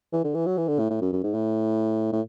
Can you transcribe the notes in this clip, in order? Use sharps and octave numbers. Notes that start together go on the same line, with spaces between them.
E3
D3
E3
F#3
E3
D3
A2
A2
F#2
F#2
G#2
A2
A2